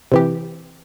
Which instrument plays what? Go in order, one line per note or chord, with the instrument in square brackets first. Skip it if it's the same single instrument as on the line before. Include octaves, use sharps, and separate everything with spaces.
[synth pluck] C3 E3 G4